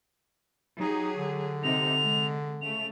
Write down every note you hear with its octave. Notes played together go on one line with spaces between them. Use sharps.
F#3 D#4 G4 G#4
D3
C3 D#4 F7
G#3
C#3 A3 F7